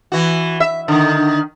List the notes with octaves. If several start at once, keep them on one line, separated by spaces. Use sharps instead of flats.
E3 F#4
E5
D3 D#3